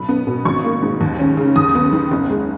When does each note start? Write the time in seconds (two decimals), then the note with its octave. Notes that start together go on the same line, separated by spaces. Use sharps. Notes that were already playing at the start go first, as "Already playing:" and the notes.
Already playing: B1 B5
0.09 B3
0.27 B2
0.45 G#1 C#6
0.64 A#3
0.82 G#2
1.01 D#2
1.19 C#4
1.37 C#3
1.56 D#2 D#6
1.75 B3
1.93 D#3
2.11 F#1
2.29 G#3